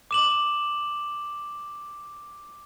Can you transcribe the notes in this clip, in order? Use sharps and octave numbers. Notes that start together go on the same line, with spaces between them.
D6 E7 F#7